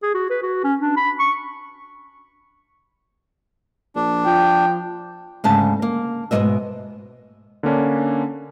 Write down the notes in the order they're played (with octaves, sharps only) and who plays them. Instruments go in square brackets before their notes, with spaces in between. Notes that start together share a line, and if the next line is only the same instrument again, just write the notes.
[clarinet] G#4
F#4
B4
F#4
C#4
D4
B5
C#6
[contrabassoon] A#1 [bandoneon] D4
[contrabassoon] F3 [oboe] G5
[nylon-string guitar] D2 G#2 C#3 A5
A#3
G#2 B2 F#3 B3 D#5 E5
[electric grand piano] D3 A#3 C#4 D4